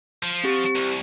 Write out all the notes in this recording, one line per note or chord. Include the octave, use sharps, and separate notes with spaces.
F3
C4 G4 C#6
C2